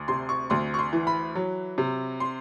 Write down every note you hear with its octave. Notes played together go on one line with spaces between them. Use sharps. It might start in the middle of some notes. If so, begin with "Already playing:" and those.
Already playing: D2
C3 C6
C#6
D2 C6
C#6
C6
E3
B5
F#3
C3
C6